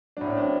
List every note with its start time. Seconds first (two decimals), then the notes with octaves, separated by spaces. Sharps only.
0.17 A2 F#3 D4
0.27 C#4
0.37 C4 D4